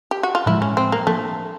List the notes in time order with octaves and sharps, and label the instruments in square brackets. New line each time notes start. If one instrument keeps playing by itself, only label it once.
[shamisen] G4
F#4
F4
[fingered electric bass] A2 F3 G#3 [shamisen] E4
[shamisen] C#4
C4
A#3
[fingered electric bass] F3 A#3 D4 [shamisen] A3